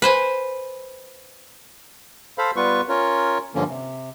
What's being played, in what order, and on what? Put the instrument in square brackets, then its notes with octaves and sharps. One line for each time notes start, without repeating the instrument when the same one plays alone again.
[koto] B4 C5 G#5
[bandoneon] A4 C5 F5 B5
G3 B3 F4 B4 C#6
C#4 F4 A#4 C#5
G2 D3 F3 A#3 C#4
C3